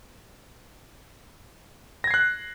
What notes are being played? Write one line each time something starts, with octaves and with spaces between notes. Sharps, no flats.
F#6 G#6 A#6 C7